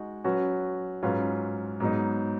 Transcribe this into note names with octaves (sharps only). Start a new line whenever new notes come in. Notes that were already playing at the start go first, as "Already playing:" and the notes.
Already playing: G#3 D#4 F#4
F#3 C#4 F#4 B4
G#2 F#3 C#4 F4 B4
G#2 F#3 B3 D#4